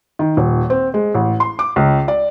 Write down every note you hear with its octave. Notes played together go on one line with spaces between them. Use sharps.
D#3
D#1
C4
G#3
A1
C6
D6
C#2
D5